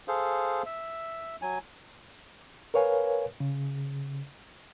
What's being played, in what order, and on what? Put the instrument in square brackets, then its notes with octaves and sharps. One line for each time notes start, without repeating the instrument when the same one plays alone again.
[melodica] G#4 A4 C5 F5
E5
F#3 G#5
[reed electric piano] A#4 B4 C#5 F5 G#5
C#3